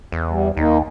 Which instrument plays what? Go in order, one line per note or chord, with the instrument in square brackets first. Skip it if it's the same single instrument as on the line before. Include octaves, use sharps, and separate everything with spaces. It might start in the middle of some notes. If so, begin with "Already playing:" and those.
[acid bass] E2
[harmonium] G3
[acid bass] D#2 [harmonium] A#3 D#4